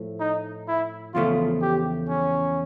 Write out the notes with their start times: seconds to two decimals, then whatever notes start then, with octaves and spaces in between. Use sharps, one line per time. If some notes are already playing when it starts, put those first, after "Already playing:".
Already playing: A2 F3 A3
0.20 D#4
0.68 E4
1.14 E2 C#3 F3 A3 F4
1.62 G4
2.09 C#4